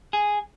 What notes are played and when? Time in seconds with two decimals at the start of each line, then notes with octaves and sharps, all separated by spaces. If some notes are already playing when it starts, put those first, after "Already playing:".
0.13 G#4